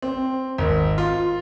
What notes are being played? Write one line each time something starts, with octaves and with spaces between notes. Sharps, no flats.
C4
G#1
F4